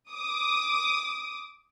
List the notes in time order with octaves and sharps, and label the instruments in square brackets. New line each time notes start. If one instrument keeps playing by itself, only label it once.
[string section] D6 D#6